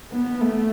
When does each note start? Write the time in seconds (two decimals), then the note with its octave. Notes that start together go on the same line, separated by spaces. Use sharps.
0.12 B3
0.41 A3